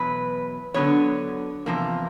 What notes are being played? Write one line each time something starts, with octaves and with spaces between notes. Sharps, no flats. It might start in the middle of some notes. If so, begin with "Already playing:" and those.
Already playing: E2 B2 F#3 B4
D3 F#3 B3 C#5
E2 C3 F3 A#3